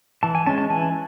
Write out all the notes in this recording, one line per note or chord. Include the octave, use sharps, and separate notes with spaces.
E3 A5
G#5
G#3 C#4 A5
A5
E3 G#5